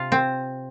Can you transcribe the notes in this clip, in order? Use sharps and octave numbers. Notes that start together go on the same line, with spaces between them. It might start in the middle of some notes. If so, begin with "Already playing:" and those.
Already playing: C3 F4 F5
C4